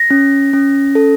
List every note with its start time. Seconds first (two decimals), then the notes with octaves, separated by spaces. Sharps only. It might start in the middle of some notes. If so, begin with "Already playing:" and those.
Already playing: A#6
0.10 C#4
0.53 C#4
0.95 A4